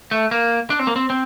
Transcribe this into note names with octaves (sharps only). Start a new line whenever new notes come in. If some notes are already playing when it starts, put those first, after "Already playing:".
A3
A#3
D4
C4
A#3
C4
C4